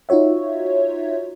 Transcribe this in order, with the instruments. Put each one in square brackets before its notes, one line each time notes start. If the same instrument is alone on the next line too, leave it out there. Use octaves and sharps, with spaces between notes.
[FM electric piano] D#4 F4 F#4 C#5 E5